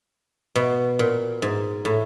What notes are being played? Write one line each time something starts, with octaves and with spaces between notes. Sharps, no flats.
B2
A#2
G#2
A2